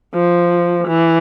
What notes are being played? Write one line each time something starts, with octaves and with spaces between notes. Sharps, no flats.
F3
E3